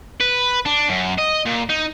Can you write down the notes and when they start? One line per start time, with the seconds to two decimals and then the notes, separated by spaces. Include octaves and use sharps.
0.20 B4
0.66 D4
0.89 F#2
1.18 D#5
1.46 A#2
1.70 D#4